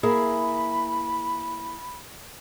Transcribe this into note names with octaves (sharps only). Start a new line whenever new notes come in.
A#3 E4 G#4 B5